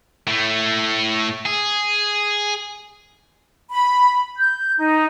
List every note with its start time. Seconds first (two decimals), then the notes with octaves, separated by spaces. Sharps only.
0.27 A2 A3
1.46 G#4
3.70 B5
4.38 G6
4.77 D#4